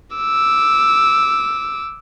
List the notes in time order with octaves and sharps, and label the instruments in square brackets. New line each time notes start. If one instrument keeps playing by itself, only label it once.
[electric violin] D6 E6